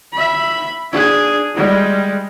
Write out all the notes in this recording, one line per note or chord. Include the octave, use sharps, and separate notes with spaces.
E5 B5
D4 G#4
G3 G#3